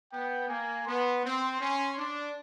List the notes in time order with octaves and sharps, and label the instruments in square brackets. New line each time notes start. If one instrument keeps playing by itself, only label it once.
[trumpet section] B3 [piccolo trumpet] G5
[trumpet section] A#3 [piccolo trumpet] G#5
[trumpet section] B3 [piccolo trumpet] C6
[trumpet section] C4
C#4
D4